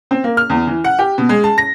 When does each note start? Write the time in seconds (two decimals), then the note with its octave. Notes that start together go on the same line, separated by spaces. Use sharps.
0.11 C4
0.24 A#3
0.37 F6
0.50 E2
0.67 E3
0.84 F#5
0.99 G4
1.18 B2
1.29 G#3
1.44 A5
1.58 A#6